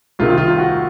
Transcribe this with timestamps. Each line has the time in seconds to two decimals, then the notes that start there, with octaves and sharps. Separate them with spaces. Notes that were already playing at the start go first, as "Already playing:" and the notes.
0.19 C2 C3 D#3 F4
0.37 F4
0.58 F#4